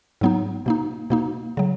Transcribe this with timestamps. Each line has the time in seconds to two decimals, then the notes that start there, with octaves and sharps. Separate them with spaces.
0.21 G#2 F#3 B3 D#4
0.66 B2 A#3 D#4
1.10 B2 A#3 D#4
1.57 C#3 F#3